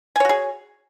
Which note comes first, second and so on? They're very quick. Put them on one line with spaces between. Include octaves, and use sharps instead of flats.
G#5 C#5 F#4 G#4